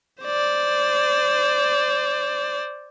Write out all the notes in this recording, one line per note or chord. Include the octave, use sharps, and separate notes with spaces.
C5 D5